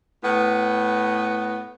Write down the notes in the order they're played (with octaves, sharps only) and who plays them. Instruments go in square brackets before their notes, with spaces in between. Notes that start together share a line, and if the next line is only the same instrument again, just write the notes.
[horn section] A2 B3